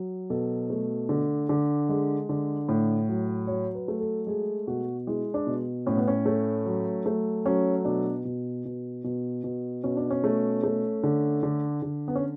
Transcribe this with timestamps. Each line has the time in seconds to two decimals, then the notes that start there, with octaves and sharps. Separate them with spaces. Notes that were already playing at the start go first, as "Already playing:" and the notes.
Already playing: F#3
0.30 B2 A4
0.70 A3
1.09 D3
1.49 D3
1.89 G#3
2.29 D3
2.69 A2
3.09 F#3
3.47 F#3 C#5
3.75 B4
3.88 A3
4.00 A4
4.27 G#3 G#4
4.67 B2 F#4
5.07 G#3 E4
5.34 D4
5.47 B2
5.86 A2 C#4
5.97 B3
6.08 C#4
6.26 A3
6.66 F#3
7.06 A3
7.45 F#3 C#4
7.85 B2 D4
8.25 B2
8.65 B2
9.04 B2
9.44 B2
9.84 B2 C#4
9.97 D4
10.10 C#4
10.24 A3
10.63 A3
11.03 D3
11.43 D3
11.82 D3
12.08 B3
12.15 C#4